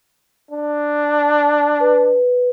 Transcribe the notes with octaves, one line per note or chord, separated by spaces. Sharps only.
D4
B4